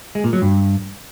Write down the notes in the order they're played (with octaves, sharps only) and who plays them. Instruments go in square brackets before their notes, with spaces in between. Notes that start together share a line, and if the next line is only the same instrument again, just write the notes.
[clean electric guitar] G#3
A#2
F#3
G2